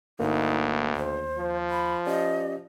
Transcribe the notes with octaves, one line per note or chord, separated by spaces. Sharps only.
G1 D2 A#3 D#4
D#2 C5
F3
B5
C#4 G4 D5 D#5